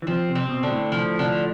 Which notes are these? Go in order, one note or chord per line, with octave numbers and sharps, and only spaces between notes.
E3
F3 C4
C3
C4
B2
D3
A2
F3
D3